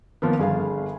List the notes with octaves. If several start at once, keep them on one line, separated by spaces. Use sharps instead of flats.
D#3 F3 A#3 B3
G1 G#4 F5